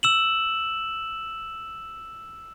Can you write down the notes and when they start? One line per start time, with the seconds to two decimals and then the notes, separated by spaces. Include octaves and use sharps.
0.03 E6 E7 F#7